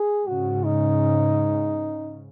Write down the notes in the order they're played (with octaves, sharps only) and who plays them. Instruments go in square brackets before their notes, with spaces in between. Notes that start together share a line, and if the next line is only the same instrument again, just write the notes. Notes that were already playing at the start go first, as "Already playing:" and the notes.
Already playing: [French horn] G#4
[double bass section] G#2 C#3 [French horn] F#4
[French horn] D#4